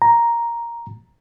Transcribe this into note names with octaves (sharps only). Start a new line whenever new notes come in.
A#5